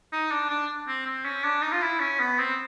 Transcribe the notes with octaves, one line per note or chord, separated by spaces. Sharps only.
D#4
D4
D4
C4
C4
C#4
D4
D#4
F4
E4
C#4
B3
C4